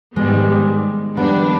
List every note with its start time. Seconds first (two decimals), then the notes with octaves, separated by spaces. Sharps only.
0.16 G#2 D#3 G3 G#3 B3
1.17 F2 D#3 G3 B3 D4